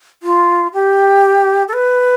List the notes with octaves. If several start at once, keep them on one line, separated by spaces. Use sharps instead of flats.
F4
G4
A4
B4